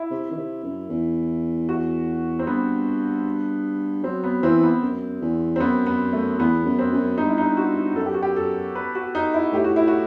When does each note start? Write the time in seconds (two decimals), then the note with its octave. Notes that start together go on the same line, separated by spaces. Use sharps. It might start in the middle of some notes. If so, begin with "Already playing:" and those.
Already playing: E4
0.11 C3
0.31 D#3
0.37 C3
0.64 F#2
0.89 E2
1.69 F#4
2.39 C4
2.47 G2 B3
4.04 F#3 C4
4.24 B3
4.43 E3 C4
4.63 B3
4.82 F#2
5.22 E2
5.56 C4
5.60 F#2 B3
5.86 B3
6.13 A3
6.39 E2 B3
6.66 F#2
6.79 C4
6.92 F#2
7.18 G2 D#4
7.28 E4
7.38 D#4
7.57 F#4
7.96 F#2 A4
8.06 G4
8.14 F#4
8.23 G4
8.36 A4
8.75 B4
8.95 F#4
9.15 D#4
9.34 E4
9.53 A2 G4
9.64 F#4
9.76 E4
9.88 F#4